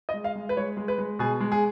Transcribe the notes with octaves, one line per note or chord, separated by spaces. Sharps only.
D#5
G#3
F5
G#3
B4
G#3 C#5
G#3
B4
G#3
B2 G#4
G#3
G#4